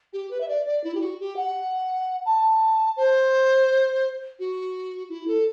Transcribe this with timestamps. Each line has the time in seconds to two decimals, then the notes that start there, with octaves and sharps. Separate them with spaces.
0.13 G4
0.31 B4
0.41 E5
0.48 D5
0.66 D5
0.84 E4
0.95 G4
1.01 F#4
1.20 G4
1.37 F#5
2.25 A5
2.97 C5
4.39 F#4
5.09 E4
5.28 A4